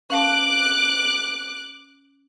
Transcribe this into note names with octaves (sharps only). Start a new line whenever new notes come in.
C#4 F5 A5 D6 F#6